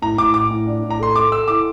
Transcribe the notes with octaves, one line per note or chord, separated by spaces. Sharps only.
A2 A#5
A2 D6
A2 D6
A2
D4
A2
A#5
A4 C6
A4 D6
A4 E6
E4 D6